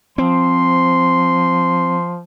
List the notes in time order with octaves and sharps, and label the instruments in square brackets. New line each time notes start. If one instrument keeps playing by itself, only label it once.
[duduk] F3 [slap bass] C4 [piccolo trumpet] C6